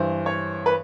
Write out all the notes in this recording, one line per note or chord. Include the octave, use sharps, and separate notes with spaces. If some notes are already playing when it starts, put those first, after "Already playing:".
Already playing: G2 E3 C5
C#5
B4